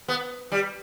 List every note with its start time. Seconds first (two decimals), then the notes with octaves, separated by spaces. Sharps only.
0.08 B3
0.52 G3